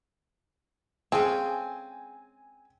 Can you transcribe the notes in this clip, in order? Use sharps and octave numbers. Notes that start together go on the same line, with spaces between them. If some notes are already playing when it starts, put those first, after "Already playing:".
G#3 C4 C#4 G#4 A4 F5 G#5